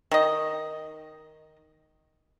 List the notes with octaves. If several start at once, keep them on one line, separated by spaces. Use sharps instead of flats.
D#3 D#5